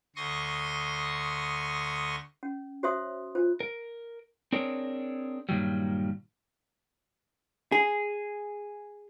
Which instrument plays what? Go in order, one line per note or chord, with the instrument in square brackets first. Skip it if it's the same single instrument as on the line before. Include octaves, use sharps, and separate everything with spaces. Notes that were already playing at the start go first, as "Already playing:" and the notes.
[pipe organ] D2 C6 C#6 D#6 A#6
[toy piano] C#4
F#4 C5 C#5 E5 C6 D#6
F4 C5
[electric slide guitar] A#4
C4 D4 G#4 A#4 C#5
G2 A#2 D#3 F#3 G3
[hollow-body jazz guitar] G#4